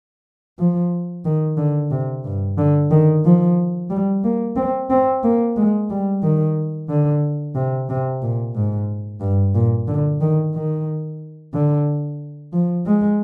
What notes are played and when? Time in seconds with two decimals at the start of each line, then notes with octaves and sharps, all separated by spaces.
0.59 F3
1.25 D#3
1.57 D3
1.91 C3
2.24 G2
2.58 D3
2.91 D#3
3.25 F3
3.90 G3
4.24 A#3
4.56 C4
4.90 C4
5.24 A#3
5.57 G#3
5.90 G3
6.23 D#3
6.89 D3
7.55 C3
7.89 C3
8.22 A#2
8.55 G#2
9.21 G2
9.55 A#2
9.88 D3
10.21 D#3
10.54 D#3
11.54 D3
12.53 F3
12.86 G#3